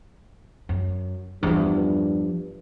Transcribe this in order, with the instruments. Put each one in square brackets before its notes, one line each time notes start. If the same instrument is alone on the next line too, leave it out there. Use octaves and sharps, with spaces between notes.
[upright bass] F#2
[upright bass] E2 F3 [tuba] G2